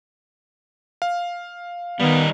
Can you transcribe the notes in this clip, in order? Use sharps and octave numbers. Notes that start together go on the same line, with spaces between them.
F5
D#3 G3 B3 D#4